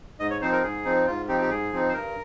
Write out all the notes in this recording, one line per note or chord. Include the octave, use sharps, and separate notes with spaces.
G#2 D#5
C#5
F3 C4 D#4 C5
A#4
G#2 G#4
F3 C4 D#4
G#2 F4
F3 C4 D#4 G4
G4
G#2 G#4
F3 C4 D#4
C5
G2 A#4